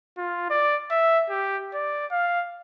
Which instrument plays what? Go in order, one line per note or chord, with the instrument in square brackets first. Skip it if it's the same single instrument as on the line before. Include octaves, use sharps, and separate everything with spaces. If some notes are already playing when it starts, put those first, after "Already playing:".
[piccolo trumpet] F4
D5
E5
G4
D5
F5